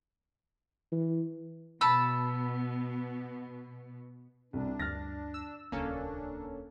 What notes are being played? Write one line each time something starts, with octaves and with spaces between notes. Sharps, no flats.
E3
B2 B3 A5 B5 E6
C2 D4
D2 G2 F6 A6 A#6
E6
D#1 C#2 A#3 C#4 D4 A4